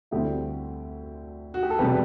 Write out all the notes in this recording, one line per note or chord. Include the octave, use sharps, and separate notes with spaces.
D2 D3 G3 C4 E4 G4
F#4
G4
A4
E1 C3 G3 G4 B4